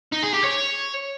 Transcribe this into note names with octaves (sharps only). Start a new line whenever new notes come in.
D#4
G#4
G4
C#5